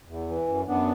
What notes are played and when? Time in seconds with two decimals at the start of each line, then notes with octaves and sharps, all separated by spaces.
0.08 E2
0.28 E3
0.48 F#2
0.68 F#2 B3 D4